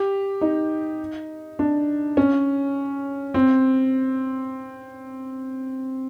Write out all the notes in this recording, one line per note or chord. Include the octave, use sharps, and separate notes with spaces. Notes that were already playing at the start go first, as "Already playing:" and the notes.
Already playing: G4
D#4
D4
C#4
C4